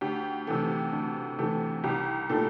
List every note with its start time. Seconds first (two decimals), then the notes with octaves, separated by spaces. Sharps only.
0.01 D2 G4
0.47 C3 E3 A3
0.92 D2
1.39 C3 E3 A3
1.84 C2 G4
2.29 A#2 A3 A4